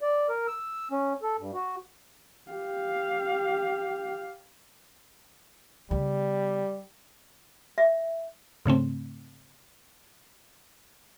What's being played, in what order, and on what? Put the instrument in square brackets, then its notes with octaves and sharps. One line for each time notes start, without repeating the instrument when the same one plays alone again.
[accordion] D5
A#4
E6
C#4
A4
G2
F#4
[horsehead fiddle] G4 F5
[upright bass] C#3 B3 [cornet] G3
[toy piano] E5
[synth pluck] G#2 C#3 A3 C4